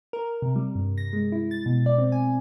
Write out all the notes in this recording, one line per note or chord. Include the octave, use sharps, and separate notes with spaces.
A#4
C3
G3
G2
A#6
G#3
E4
A6
B2
D5
C4
G#5